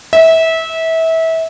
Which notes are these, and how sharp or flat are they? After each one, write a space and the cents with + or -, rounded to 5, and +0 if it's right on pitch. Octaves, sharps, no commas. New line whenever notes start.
E5 -25